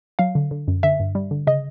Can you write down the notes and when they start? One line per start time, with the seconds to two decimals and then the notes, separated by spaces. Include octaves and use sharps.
0.19 F#3 F5
0.35 D3
0.51 D3
0.68 F#2
0.83 D3 E5
1.00 G2
1.15 G3
1.31 D3
1.47 C#3 D#5